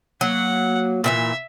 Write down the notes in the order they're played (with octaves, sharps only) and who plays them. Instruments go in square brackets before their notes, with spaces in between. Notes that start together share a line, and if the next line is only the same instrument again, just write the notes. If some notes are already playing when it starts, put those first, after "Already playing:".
[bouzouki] F#3 [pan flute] A#3 [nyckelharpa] F#5
[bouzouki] A#2 D3 E3 [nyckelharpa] E5